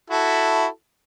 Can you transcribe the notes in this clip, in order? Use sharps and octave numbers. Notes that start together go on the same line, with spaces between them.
E4 F#4 A4